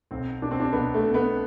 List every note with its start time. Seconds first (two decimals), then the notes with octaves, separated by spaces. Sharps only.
0.11 B1 C4
0.42 B2 D4
0.51 C4
0.60 D4
0.73 B1 B3
0.94 A3
1.04 B2
1.14 B3